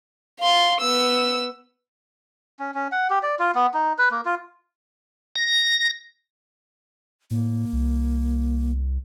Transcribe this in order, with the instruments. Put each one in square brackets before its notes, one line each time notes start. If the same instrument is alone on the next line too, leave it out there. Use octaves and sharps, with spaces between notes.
[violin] F5 C6
B3 E6
[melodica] C#4
C#4
F#5
G4
D5
F4
B3
D#4
B4
A#3
F4
[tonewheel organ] A#6
[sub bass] A2 [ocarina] A#3
[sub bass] C2